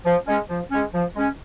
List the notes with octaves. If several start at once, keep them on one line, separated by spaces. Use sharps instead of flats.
F3
G#3 C#4
F3
G#3 C#4
F3
G#3 C#4